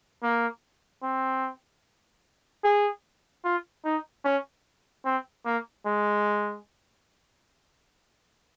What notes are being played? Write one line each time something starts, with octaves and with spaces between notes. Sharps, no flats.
A#3
C4
G#4
F4
D#4
C#4
C4
A#3
G#3